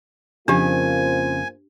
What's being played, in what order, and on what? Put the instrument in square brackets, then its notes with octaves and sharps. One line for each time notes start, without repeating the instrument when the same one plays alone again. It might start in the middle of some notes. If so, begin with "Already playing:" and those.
[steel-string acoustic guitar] F2 C#3 [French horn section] A#3 F4 C5 [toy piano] D4 G4 [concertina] G#5